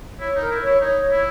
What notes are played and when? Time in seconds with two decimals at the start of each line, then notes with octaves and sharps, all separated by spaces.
0.20 E4 C#5
0.36 D#4 A#4
0.51 E4
0.61 E4 C#5
0.81 D#4 C#5
1.01 C#5
1.12 E4